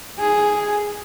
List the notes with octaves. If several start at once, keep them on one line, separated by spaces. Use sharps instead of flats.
G#4